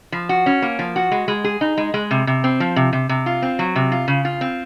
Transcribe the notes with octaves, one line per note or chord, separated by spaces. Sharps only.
F3
F#4
C#4
A#3
F3
F#4
G#3
G#3
G#4
D#4
G#3
G#3
C3
C3
C4
F3
C3
C3
C3
F4
C4
F#3
C3
F4
C#3
F4
C4